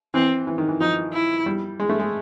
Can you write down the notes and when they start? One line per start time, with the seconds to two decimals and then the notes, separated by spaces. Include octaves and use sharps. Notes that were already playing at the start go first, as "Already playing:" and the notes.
0.14 E3 C4
0.47 E3
0.58 D#3
0.68 E3
0.80 F3 D#4
1.13 E4
1.46 G3
1.80 G#3
1.89 A3
1.99 G#3